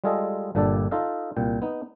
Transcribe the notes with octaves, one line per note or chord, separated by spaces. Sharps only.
G3 G#3 F4 G#4 A4 D#5
G1 A#2 G3 D4 A4 D5
D#4 F4 A4 D#5 F5
C2 A#2 G5
B3 D#4